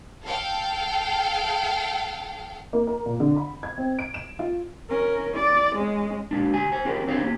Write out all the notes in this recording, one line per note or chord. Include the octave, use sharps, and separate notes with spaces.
A4 F5 G5
A#3
A#4
A#2
D3
B5
G#6
C4
D7
E7
F4
C#4 A#4
D5
G#3 C#4
A#2 G#3 D4
D2 G4 G#5
C5 G#5
C#4 F4 G4 G#4 A#4
C4 D4 C5 C#5 F5
A#3 C#4 F#4 G4